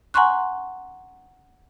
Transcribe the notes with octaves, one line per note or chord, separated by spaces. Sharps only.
F#5 G#5 A#5 C6 C#6 F#6